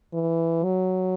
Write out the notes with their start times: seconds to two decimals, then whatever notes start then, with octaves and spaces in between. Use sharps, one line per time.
0.13 E3
0.64 F#3